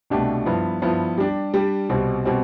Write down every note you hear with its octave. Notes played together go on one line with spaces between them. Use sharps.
C2 B2 A3 D4 G4
G2 F3 B3 E4
G2 F3 B3 E4
G3 D4 G4
G3 D4 G4
C2 B2 G3 C4
B2 G3 C4